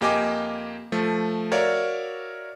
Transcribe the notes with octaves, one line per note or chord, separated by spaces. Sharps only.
F2 A#3 G4 D#5 G#5 D6
F3 A3
F#4 A#4 C#5 D5 E5 F5